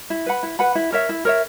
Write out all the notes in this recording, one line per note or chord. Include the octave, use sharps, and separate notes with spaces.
E4
B4 F#5 B5
E4
B4 F#5 B5
E4
A#4 C#5 E5
E4
A#4 C#5 E5